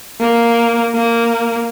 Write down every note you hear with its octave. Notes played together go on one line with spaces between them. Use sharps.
A#3
A#3